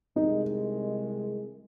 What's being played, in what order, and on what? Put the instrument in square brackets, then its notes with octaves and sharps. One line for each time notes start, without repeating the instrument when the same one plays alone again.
[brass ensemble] C2 C3 D#3 G#3 [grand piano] D#4